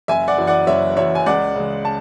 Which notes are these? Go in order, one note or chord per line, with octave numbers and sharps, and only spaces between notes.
F#1 E5 G#5
D5 F#5
F#2 E3
D5 F#5
F#1 C#5 E5
F#2 E3 C#5 E5
G#5
C#2 D5 F#5
C#3 G#3
A5